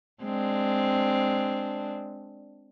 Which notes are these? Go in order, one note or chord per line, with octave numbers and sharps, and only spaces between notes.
G#3 C4 D4